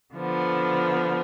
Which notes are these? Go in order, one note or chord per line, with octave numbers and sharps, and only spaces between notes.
D3 F3 B3